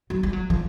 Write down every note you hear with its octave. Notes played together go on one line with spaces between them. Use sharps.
F#3
G3
F#3
F3